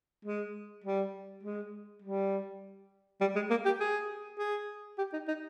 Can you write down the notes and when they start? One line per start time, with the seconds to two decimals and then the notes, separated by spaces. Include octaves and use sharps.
0.25 G#3
0.84 G3
1.43 G#3
2.02 G3
3.21 G3
3.36 G#3
3.50 A#3
3.65 G4
3.80 G#4
4.39 G#4
4.98 G4
5.13 D#4
5.28 D#4